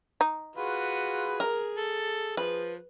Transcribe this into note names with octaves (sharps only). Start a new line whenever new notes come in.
D#4
F4 F#4 G#4 B4
A#4
A4
F3 B4